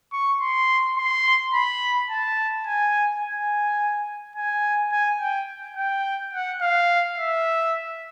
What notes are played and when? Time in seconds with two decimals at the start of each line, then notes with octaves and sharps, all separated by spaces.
0.12 C#6
0.40 C6
0.97 C6
1.53 B5
2.10 A5
2.66 G#5
3.23 G#5
4.36 G#5
4.92 G#5
5.20 G5
5.77 G5
6.33 F#5
6.61 F5
7.18 E5